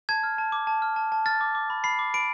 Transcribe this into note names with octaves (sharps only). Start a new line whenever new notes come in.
A5 G#6
F6
A5
D6
A5
F6
A5
A5
F6 A6
D6
D6
B5
B5 C7
D6
B5 D7